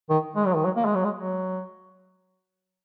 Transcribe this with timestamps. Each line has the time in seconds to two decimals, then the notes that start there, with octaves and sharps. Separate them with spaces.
0.10 D#3
0.36 G#3
0.46 F#3
0.55 D#3
0.65 F#3
0.76 A#3
0.85 G#3
0.94 F#3
1.04 G#3
1.15 F#3